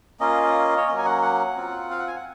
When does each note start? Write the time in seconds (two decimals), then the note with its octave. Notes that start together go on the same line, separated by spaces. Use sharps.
0.20 A#3 C#4 F4 D#5
0.77 C#5
0.88 F#3 A#3 C#4 D#5
0.98 G#5
1.05 F#5
1.22 F#5
1.56 C4 F4
1.91 F5
1.99 F#5
2.07 G#5
2.16 F#5